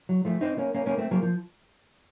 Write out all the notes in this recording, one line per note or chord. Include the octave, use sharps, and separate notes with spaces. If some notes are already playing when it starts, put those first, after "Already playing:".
F#3
F3 A3
C4 D#4
A#3 C#4
A#3 C#4
A#3 C#4
A3 C4
F#3 A#3
F3